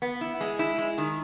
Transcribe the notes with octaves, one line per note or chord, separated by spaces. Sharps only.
B3
E4
G#3
E4
G#3
D#3